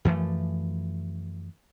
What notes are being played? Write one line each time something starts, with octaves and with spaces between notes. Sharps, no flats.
F#2 E3 F3 A3